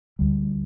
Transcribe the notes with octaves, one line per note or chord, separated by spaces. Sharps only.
D2 D3 G3